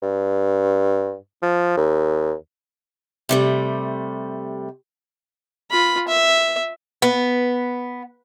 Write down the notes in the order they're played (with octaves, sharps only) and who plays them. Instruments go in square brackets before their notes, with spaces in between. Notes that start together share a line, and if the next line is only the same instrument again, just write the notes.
[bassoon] G2
F3
D#2
[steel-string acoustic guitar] C3 G3 A3
[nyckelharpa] F4 B5
E5
[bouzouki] B3